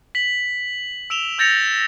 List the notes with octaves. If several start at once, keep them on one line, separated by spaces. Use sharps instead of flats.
B6 F#7
E6 D7 E7 F7 G7
E6 G6 A6 A#6 C#7 F7